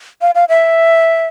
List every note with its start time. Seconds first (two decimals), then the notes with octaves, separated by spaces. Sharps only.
0.21 F5
0.35 F5
0.49 E5